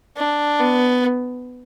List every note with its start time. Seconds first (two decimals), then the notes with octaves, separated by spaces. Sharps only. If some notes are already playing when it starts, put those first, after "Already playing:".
0.17 D4
0.59 B3